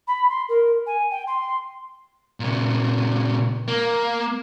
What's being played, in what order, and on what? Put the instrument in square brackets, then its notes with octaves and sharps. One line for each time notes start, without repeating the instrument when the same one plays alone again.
[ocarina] B5
C6
A#4
G#5
G5
C6
[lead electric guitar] A#2 C#3
A#3